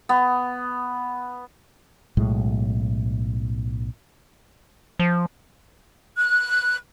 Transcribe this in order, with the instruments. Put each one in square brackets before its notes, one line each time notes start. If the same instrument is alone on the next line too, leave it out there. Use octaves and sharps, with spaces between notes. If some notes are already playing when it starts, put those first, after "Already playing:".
[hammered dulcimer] B3
[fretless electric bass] B1 A2 G#3
[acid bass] F3
[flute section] F#6